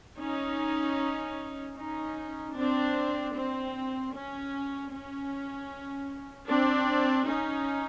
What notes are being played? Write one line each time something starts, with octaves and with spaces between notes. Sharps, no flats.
C#4 D#4
C#4 D#4
C4 D4
C4
C#4
C#4
C4 D4
C#4 D#4